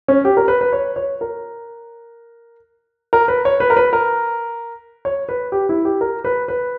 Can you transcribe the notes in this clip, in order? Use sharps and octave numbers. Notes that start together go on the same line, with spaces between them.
C#4
G4
A#4
B4
B4
C#5
C#5
A#4
A#4
B4
C#5
B4
A#4
B4
A#4
C#5
B4
G4
E4
G4
A#4
B4
B4